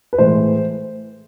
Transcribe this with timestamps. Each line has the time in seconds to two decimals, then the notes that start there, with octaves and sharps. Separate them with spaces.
0.13 B4
0.18 A2 E3 G#3 C5